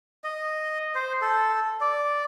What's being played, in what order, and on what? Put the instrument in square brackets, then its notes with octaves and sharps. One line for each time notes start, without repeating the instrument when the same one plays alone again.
[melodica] D#5
C5
A4
D5